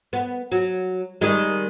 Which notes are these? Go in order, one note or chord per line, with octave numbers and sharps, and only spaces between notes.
B3
F#3
D#3 G3 G#3